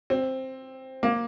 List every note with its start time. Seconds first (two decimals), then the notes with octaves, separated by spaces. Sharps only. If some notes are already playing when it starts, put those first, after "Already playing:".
0.10 C4
1.03 A#3